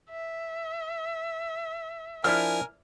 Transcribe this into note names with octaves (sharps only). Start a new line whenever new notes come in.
E5
F3 D4 E4 A#4 G#5 F6